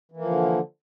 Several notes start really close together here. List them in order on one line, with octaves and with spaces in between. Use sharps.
E3 A#3 F3 D3